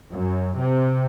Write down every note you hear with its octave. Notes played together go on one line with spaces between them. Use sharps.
F#2
C3